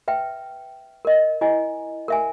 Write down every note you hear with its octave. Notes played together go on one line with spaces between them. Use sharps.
B4 E5 G5
A#4 D#5
E4 D#5 G#5
A#4 E5 G#5